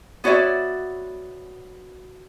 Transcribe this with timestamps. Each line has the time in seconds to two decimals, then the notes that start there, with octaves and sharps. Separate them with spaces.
0.24 B3 F#4 C#5 D5 E5